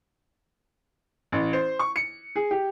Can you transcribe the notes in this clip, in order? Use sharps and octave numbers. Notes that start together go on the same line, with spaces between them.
A1
C5
C#6
C#7
G#4
G4